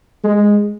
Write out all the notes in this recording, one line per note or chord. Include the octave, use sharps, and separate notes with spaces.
G#3